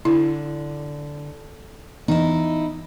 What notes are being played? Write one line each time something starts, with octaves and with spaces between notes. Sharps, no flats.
D3 E4
E3 B3 D#4 E4